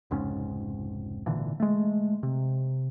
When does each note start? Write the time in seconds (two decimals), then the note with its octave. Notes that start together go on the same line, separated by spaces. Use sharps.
0.11 F1 C#2 G#2 C#4
1.26 G#1 A#2 D3 E3
1.60 G#3 A3
2.23 C3